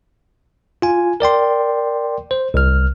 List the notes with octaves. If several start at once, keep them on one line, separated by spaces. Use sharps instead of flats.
F4 G#5
A#4 D5 G5 C6
C5
C2 F6